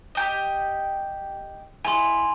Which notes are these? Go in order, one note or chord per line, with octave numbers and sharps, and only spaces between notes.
G4 D#5
E4 G#5 C6